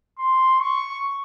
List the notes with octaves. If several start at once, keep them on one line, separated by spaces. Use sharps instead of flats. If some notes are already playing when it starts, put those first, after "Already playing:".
C6
C#6